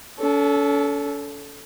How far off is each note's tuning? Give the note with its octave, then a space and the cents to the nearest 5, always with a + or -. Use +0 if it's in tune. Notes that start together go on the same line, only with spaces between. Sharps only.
C#4 +40 A4 -5